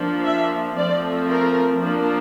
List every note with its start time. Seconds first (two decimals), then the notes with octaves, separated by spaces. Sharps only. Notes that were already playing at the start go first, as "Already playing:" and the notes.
Already playing: F3 A#3 D4
0.25 E5
0.76 F3 A3 C4 D5
1.27 A#4
1.78 F3 A#3 D4